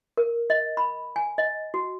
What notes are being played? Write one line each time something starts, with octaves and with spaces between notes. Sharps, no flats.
A#4
D#5
B5
G#5
D#5
F#4